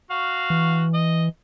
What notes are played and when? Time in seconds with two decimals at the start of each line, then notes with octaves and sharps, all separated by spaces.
0.11 F#4 F5
0.50 E3
0.94 D#5